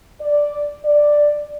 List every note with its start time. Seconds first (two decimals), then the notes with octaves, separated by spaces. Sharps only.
0.21 D5
0.85 D5